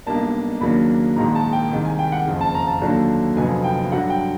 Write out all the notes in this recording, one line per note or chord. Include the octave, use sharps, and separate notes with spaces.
B1 B2 G3 A#3 D4 A5
D#2 C#3 F#3 A#3 D4 B5
A#1 G#2 D#3 A#5
A5
G5
C2 C3 D#3 G#3
G#5
G5
F#5
F#1 F2 C#3
A5
A#5
A5
D#2 D3 F#3 A3 D4
F1 F2 D3 F#3 B3 G#5
G5
G2 D3 F#3 F#5
G5